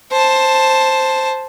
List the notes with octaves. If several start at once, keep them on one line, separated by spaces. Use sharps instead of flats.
C5 A5